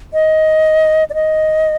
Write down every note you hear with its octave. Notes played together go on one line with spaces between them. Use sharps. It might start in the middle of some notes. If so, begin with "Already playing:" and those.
D#5
D5
D#5